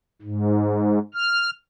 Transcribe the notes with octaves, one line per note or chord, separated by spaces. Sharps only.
G#2
F6